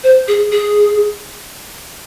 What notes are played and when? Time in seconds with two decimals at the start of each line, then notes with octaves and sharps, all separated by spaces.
0.04 C5
0.28 G#4
0.52 G#4